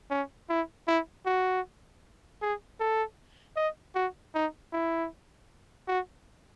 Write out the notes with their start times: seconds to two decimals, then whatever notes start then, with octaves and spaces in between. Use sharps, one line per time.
0.10 C#4
0.50 E4
0.88 E4
1.26 F#4
2.42 G#4
2.80 A4
3.57 D#5
3.95 F#4
4.35 D#4
4.73 E4
5.88 F#4